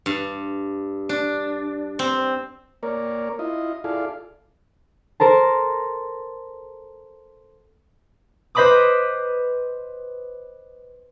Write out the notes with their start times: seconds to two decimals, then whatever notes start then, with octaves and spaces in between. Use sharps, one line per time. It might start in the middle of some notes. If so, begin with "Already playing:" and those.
0.06 G2
1.09 D4
1.99 C4
2.83 A#3 A#4 C#5 D5
3.39 E4 F4 D#5
3.84 E4 F4 G#4 A4 D5 F5
5.20 A4 A#4 C5 A5
8.55 B4 C5 D#5 B5 D6 D#6